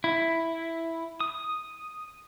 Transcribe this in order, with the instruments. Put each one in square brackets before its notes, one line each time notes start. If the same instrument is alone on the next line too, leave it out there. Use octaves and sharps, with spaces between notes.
[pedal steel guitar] E4
D#6